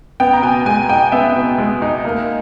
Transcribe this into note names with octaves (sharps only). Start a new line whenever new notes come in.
B3 G5
A#5
B2 G#5
G#3 G#5
D#4 G5
B3 E5
B2
G#3
D#4
A#3